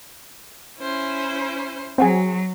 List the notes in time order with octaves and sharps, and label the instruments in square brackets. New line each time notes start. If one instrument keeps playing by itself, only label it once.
[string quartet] C#4 E4 C5
[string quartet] F#3 [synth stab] C4 F#4 G#4